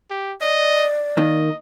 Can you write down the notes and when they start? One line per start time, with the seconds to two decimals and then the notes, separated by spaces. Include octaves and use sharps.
0.11 G4
0.41 D5 D#5
1.17 D#3 A#3 D#5